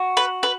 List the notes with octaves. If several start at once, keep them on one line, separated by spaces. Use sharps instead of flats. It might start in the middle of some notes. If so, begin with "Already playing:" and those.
Already playing: F#4
B4
B4